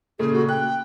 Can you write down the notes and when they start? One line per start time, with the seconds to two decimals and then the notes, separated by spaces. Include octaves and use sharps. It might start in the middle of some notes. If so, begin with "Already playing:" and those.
0.19 A#2 C#3 A3 G#4
0.33 F#4
0.49 G5 F#6